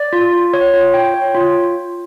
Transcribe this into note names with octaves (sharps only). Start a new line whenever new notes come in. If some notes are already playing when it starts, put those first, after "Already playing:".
Already playing: D5
F4
F4
C#5
F4
G5
C#5
F4